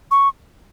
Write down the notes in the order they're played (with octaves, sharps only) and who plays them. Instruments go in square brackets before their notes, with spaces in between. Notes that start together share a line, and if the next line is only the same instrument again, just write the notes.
[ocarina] C#6